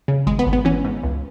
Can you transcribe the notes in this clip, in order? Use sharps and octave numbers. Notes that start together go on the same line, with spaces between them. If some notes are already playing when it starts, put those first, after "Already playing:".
C#3
G#1 G#3
B3
G#1
B3
E3 C#4
G#2
C#2